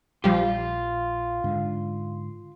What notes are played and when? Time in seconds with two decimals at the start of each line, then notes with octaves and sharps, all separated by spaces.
0.24 A#1 F3 G3 F4 G4
1.44 G#2 D3